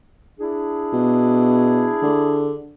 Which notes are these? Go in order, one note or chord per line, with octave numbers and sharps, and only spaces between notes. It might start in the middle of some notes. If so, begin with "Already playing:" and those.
D4 E4 G#4
B2
D3